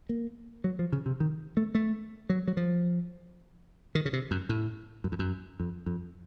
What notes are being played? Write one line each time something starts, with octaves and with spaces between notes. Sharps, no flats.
A#3
F#3
F3
C#3
C3
D#3
A3
A3
F#3
F#3
F3
D#3
C#3
C3
F#2
A2
F#2
F2
F#2
F2
F2